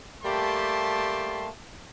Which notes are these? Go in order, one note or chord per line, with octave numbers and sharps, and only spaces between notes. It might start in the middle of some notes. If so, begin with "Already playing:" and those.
G3 A3 A#3 G4 A5 C6